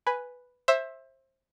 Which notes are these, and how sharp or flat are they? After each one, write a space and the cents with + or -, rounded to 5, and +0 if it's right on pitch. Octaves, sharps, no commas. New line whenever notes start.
B4 +0 G#5 +0
C5 +25 E5 +0